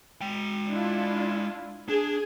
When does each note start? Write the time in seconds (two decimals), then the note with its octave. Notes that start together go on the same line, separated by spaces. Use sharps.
0.21 G#3 G5
0.68 D4 E4 F4
1.88 D4 G#4